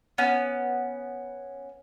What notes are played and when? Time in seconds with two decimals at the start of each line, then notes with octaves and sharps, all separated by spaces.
0.18 B3 C#4